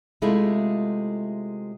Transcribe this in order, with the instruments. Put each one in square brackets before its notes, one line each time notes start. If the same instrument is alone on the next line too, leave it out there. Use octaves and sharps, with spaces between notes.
[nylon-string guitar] C3 G#3 A3 E4 F4